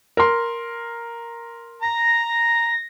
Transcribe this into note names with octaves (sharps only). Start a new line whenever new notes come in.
A#4 C6
A#5 A#6